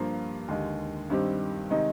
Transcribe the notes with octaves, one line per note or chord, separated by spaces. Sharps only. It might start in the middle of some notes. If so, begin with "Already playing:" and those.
Already playing: G2 F3 A#3 F4
D#2 D3 G#3
G2 D#3 G3 C4 G4
C3 D#3 G#3 D#4